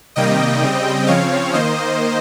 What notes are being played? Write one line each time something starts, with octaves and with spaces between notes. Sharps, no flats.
C3 D#3 G3 A#3 D#5 G5
C#3 G3 C4
C#3 F3 C4 C#5 F5
D#3 A#3 C5 D#5